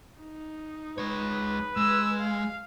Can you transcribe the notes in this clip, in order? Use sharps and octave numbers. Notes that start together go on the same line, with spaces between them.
D#4
G#3 B4 C#5
G#3 E6
F5